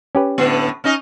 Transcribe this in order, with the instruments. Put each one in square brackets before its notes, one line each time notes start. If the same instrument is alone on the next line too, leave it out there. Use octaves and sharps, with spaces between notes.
[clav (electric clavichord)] C#4 G4 B4
[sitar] A2 D3 B3
C#4 D#4 D#5